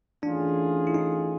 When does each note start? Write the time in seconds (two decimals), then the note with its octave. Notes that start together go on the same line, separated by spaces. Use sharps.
0.22 E3 A3 C#4 D4 F4 G#4
0.87 E4
0.94 D#4